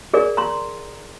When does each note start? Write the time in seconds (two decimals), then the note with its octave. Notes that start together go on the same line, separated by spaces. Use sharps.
0.14 G#4 A#4 D5
0.37 A#5 C6